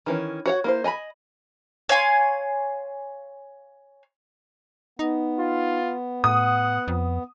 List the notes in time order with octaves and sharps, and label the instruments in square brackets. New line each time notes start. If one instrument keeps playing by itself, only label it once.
[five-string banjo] D#3 E3 C#4
F#4 C#5 F#5
A#3 E4 C5
D#5 G#5 A#5 B5
[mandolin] C#5 F5 G#5 C6
[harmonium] B3 [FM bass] D#4
[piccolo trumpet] F4
[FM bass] A2 [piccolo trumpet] F#5 [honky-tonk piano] D#6
[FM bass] F2